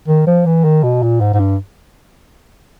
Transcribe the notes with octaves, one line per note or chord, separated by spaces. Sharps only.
D#3
F3
E3
D#3
B2
A#2
G#2
G#2
G2